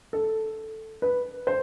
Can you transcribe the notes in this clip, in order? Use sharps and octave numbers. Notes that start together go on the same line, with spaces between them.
A4
B4
C5